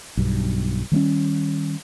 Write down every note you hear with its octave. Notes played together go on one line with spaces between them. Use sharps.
B1 G2
D#3 G3 G#3 C#4